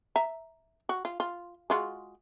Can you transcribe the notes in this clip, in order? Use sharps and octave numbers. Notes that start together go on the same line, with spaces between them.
E5 A#5
F#4
F4
F4
G#3 F4 F#4